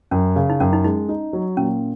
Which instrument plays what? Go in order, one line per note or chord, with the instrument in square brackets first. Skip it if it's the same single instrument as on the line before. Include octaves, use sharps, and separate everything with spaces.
[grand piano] F#2 [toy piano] C#4
[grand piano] C#3
[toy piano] D#4
[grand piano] F#2 [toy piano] C#4
[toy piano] D#4
[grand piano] G#3 [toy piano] D#4
[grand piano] D#4
F#3
[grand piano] A#2 [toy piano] C#4